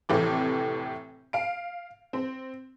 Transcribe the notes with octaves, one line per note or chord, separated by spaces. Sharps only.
F1 A2 C3 E3 D6
F5 D7
C4